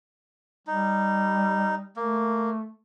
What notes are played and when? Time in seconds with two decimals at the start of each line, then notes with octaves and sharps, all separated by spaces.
0.67 G3 D#4
1.96 A3 A#3